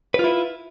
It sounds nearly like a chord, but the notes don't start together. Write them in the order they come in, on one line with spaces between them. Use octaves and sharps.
B4 F4 E4